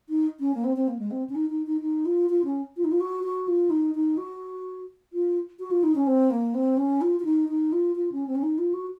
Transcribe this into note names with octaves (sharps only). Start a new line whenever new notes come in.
D#4
C#4
A#3
C4
C4
A#3
G#3
C4
C#4
D#4
D#4
D#4
D#4
F4
F4
C#4
F4
D#4
F4
F#4
F#4
F4
D#4
D#4
F#4
F4
F#4
F4
D#4
C#4
C4
A#3
C4
C#4
F4
F4
D#4
D#4
F4
F4
C#4
C4
C#4
D#4
F4
F#4